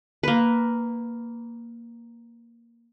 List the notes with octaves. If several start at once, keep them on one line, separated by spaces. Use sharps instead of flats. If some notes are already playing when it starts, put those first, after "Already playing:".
A#3 B4